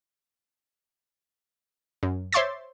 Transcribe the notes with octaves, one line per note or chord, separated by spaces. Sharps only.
F#2
C5 C#5 E5 C6 D6 A6